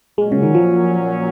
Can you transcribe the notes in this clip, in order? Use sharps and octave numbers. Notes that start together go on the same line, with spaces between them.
A#2 F#3 G#3 C#4
C#3
D#3
F3